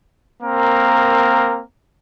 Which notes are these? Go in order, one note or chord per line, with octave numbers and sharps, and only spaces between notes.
A#3 C4 A#4